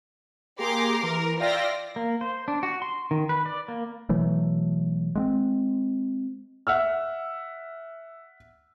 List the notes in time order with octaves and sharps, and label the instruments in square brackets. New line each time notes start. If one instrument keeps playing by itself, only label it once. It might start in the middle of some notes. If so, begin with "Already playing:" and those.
[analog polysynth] A#3 G4 G#4 [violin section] A#5 C6 D6
[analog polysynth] E3 [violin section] A#4
[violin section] F4 D5 A#6 [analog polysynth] E5 F5 G5
[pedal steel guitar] A#3
C5
D4
F#4
C6
D#3
B4
D5
A#3
[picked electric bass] B2 E3 F#3 A3
G#3 B3 C4
[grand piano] E5 F#5 E6 F6